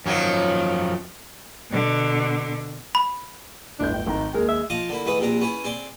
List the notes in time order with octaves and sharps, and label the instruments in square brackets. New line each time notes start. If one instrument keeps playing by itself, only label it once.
[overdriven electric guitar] F#2 F3 [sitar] D#3 F#3 C#4
[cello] B2 D3
[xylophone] B5
[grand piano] D1 G1 G6 [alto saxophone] D4
[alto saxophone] G5
[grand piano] G#1 D#3 A#5
[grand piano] D#2 G#3 [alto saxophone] A#4
[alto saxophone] E5
[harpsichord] F3 D#5 F5 A5 D6
D3 A#3 E4
G#2 E3 A3 B4 D#6
A#1 C3 D4 A#5
B3 C#4 E4 G#4
C4 G#4 D5 C6